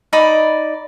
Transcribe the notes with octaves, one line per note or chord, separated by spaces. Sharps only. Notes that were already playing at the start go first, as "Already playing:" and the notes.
D#4 D5 B5